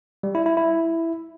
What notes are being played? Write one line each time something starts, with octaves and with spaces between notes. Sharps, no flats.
G3
E4
E4
E4